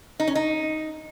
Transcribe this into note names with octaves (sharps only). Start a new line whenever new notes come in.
D#4
C#4
D#4